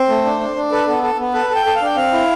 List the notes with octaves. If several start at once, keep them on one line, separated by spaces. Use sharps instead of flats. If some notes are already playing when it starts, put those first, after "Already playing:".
Already playing: C4 C5
A3
D4
D4
D4
A4 B4
B3 A4
A4
B3
A4 B4
A4
G5
A4
F5
D4 G5
C4 F5
E4